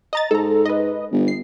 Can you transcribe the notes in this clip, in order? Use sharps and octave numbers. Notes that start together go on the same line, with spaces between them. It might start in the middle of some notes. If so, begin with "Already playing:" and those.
D#5 A#5 A6
G#2 A4 A#5
B4 D#5
G1
C7